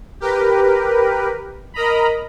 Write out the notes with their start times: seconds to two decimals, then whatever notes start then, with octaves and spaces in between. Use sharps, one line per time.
0.20 G4 A#4 B4
1.74 A#4 D#5 A#5 B5